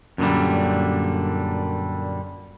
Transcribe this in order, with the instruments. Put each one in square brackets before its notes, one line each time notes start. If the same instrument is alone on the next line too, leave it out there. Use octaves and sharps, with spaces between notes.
[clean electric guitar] F#2 A#2 D3 G3